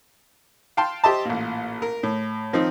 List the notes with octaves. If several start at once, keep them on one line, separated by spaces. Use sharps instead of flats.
F5 G5 A5 C6
G4 C5 D#5 E5 A5
A1 A#2
A#4
A2
D#3 F3 C4 D#4